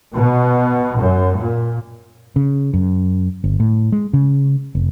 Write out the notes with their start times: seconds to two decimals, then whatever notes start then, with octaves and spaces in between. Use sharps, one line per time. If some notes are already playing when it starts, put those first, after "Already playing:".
0.14 B2
0.98 F#2
1.37 A#2
2.36 C#3
2.74 F#2
3.44 G1
3.60 A2
3.92 G#3
4.13 C#3
4.75 F1